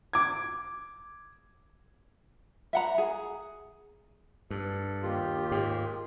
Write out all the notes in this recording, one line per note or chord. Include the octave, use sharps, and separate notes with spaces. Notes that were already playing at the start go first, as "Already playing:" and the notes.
D6 G#6
E5 F#5 A#5
G#4
G2 A4
D#2 D#3 F4 G4
G#2